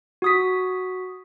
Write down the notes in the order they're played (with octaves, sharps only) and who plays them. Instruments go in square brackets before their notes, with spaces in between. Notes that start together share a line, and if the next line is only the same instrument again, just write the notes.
[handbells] F#4 D#6 B6